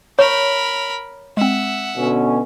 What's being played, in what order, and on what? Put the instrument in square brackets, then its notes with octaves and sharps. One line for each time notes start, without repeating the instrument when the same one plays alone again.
[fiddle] A#4 B5 [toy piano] C#5 [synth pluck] C#6
[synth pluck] G#3 C4 [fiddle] E5 F#5
[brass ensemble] B2 D3 C#4